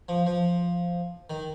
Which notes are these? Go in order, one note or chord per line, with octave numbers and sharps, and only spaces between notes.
F3
F3
D#3